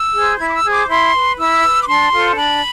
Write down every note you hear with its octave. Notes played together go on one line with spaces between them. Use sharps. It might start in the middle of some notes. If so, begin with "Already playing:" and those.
Already playing: E6
G#4 C5
E4 G#6
D6
E6
G#4 C5
D6
E4 C6
B4
E4 E6
B4
D6
D4 C6
F4 A4 C5
D4 B5